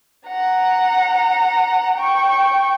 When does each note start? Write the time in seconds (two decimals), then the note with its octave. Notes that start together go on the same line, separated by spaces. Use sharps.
0.27 F#5 A#5
1.95 G5 C#6